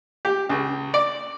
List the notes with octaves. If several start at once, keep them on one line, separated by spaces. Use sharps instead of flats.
G4
C#2
D5